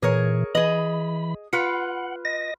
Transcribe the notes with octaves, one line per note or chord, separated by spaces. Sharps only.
A#2 E3 G#4 A#4 C#5
E3 G#4 D#5 B5
F4 B4 F#5
D#5 A#6